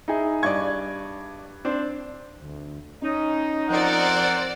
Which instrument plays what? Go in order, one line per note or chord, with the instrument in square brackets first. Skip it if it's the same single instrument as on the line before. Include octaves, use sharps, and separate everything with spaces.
[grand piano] D#4 E4 G#4
[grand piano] G2 G#6 [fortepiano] D5 D#5 C#6
[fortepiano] C4 D4 C5
[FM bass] D2
[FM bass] C#4 [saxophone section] D#4
[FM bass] F3 [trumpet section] C4 A#4 F#5 [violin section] C5 D5